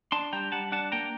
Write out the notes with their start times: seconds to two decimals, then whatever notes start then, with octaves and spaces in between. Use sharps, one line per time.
0.12 D4 A5 C6
0.33 G3 G5 A#5
0.52 G3 F#5 A5
0.72 D4 F#5 A5
0.92 A#3 G5 A#5